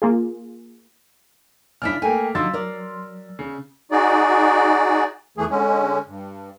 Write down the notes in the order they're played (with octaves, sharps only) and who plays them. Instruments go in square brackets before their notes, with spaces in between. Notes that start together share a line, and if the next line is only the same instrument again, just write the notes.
[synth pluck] A#3 F4 G#4
[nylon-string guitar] C#3 D4 E4 [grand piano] F6 B6
[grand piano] A3 A#3 [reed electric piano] G5 [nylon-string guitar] G#5
[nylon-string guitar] D3 F3 D#4 [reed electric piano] F#3 [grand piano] C6 E6 A6
[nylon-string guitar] A#4 D5
[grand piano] C#3
[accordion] D#4 F#4 G#4 D5
E2 E3 A3 G#4
D3 G#3 C#4
G2